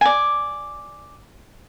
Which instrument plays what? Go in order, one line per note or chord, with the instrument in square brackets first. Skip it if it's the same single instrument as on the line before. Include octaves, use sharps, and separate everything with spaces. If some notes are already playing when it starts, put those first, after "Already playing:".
[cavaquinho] D5 G#5